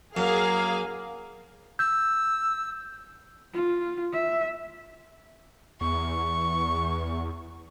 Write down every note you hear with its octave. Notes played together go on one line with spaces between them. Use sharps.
F#2 A#3 G#4 A#4 F5
E6 G6
F4
E5
E2 C#6